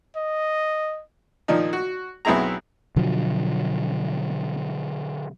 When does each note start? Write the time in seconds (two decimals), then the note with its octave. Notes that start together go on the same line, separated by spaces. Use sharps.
0.16 D#5
1.48 A#2 D#3 F3 D4 D#4
1.73 F#4
2.25 B1 B3 C4 E4 G#4 A#5
2.96 B2 D3 F3 F#3